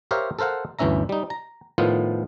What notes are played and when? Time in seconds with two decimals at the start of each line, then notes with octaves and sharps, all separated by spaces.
0.11 G4 A#4 C5 C#5 E5 F5
0.39 A4 A#4 C5 F5 F#5
0.79 G1 D2 E3 C#4 E5 A#5
1.09 G3 D#4
1.30 A#5
1.78 A2 D#3 F3 B3 F4